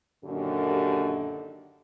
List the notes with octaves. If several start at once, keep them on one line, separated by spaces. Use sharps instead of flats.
F#2 A#2 D3 D#3 G4